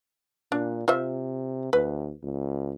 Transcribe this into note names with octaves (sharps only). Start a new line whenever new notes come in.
A#2 D4
C3 F4 C5 E5
D2 B4
C#2